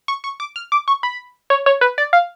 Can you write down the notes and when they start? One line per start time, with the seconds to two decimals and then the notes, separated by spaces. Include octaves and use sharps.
0.08 C#6
0.24 C#6
0.40 D6
0.56 F6
0.72 D6
0.88 C#6
1.03 B5
1.50 C#5
1.66 C#5
1.81 B4
1.98 D5
2.13 F5